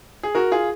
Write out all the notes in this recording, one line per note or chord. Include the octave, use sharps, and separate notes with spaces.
G#4
F#4 A#4
F4 G#4